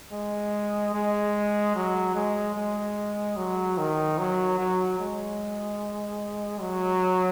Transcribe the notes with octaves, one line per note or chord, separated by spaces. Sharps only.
G#3
G#3
F#3
G#3
G#3
F#3
D#3
F#3
F#3
G#3
F#3